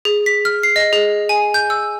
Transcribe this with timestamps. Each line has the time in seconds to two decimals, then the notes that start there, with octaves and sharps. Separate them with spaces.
0.05 G#4
0.26 B6
0.45 F6
0.63 C7
0.76 D#5
0.93 G#4
1.29 G#5
1.54 G6
1.70 E6